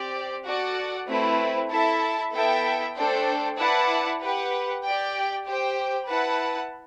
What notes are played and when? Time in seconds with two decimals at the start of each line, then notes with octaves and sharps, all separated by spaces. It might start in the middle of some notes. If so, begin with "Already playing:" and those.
Already playing: C4 G4 D5
0.45 F#4 A4 D5 F#5
1.07 A3 C4 E4 B4
1.70 E4 A4 E5 A5
2.32 B3 E4 A4 E5 G5
2.95 A3 D4 A4 C5 G5
3.57 E4 B4 D5 F#5 A5
4.20 G4 B4 F#5
4.82 G4 D5 G5
5.45 G4 C5 G5
6.07 E4 B4 F#5 A5